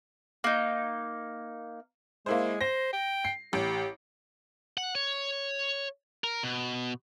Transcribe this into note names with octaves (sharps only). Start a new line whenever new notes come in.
A#3 D#4
G#3 A#3 E4 C5
C5 A#6
G5
C7
A1 G4 D7
F#5
C#5
A#4
B2